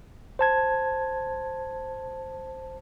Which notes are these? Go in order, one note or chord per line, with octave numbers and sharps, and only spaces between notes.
C5 A5 G#6